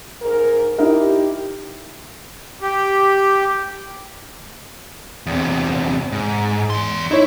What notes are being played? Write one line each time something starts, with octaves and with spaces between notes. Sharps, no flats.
G#2 A#4
D#4 E4 G4 A#4
G4
E2 C3
G#2
E2 C6
D#4 E4 C#5